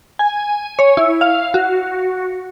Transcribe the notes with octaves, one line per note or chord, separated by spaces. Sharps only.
G#5
C#5
E4
F5
F#4